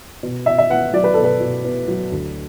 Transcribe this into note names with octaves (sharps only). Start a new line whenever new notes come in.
B2
B2 E5
E5
B3 F#5
F#3 D5
B4
B2 A4
B4
B2
B3
F#3
D2